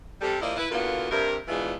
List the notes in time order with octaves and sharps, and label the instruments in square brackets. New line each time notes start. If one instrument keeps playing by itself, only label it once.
[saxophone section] C3 G3 A4
F3 A#3 E4 D5 D#5
E4 B4
D3 E3 A#3 B3 F4 F#4
G2 C3 A#4
G#2 B2 E3 G#3 D4 F4